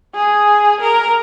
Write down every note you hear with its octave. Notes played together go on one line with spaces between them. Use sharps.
G#4
A#4